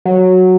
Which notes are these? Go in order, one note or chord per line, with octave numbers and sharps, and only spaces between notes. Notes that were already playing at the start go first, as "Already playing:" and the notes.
F#3